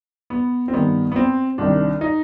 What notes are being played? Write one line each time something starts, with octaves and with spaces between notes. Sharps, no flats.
B3
C4
G2 D#3 B3
B3
C4
C2 C3 D#3 D4
D#4